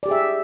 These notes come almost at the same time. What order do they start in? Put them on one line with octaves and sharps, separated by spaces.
D5 G4 G#4 E5